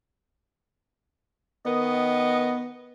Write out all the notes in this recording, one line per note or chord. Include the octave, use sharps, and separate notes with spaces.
D#3 B3 D#5